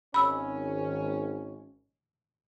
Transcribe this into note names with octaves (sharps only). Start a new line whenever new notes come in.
G#1 C#4 B5 E6